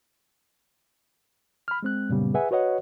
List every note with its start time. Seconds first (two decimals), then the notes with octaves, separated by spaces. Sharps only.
1.68 B5 F6
1.83 G#3 C4 F#6
2.09 F#2 A#2 C#3 G3 B3
2.34 G#4 B4 E5 F#5 G#5
2.51 F#4 B4 C#5 D#5 F#5